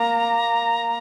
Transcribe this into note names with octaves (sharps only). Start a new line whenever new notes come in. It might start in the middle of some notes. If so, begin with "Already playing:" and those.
Already playing: A#3 A#5